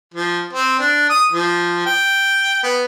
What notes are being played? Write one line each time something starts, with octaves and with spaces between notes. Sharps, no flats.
F3
C4
D4
D#6
F3
G5
B3